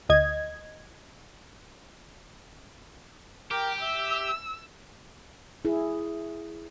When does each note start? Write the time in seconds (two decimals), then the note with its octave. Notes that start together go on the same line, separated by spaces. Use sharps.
0.09 D2 D#5 G#6
3.51 G4 A#4 G5
3.81 E5 E6
5.65 E4 G#4